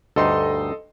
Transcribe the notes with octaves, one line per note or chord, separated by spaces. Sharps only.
D2 G2 D#4 A4 D#5 C6